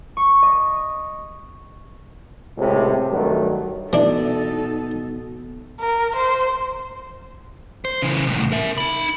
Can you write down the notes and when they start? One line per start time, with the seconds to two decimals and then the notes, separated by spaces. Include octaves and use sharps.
0.17 C#6
0.43 D#5
2.58 C#2 A2 C3
3.10 G2 D#3 F#3 A3
3.93 B2 E3 D4 D#4 A4
5.80 A#4
6.16 C5
7.85 C5
8.02 C#3 E3
8.26 C2 A2
8.52 A#4 E5
8.78 D#4 B5